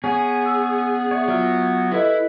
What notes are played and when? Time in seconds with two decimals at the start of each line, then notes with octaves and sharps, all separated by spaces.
0.04 B3 C#4 G#4
0.46 E6
1.11 C#5 D5 E5
1.28 F#3 F4 E5 F6
1.91 E4 G4 A4 B4 D#5